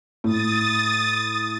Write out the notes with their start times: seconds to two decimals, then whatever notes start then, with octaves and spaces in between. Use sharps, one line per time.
0.24 A2 D#6 A6